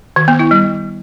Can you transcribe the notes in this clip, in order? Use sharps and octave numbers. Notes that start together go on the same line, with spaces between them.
D#3
B3
E4
G3